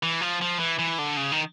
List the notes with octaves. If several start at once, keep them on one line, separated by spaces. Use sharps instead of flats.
E3
F3
F3
E3
E3
D3
C#3
D#3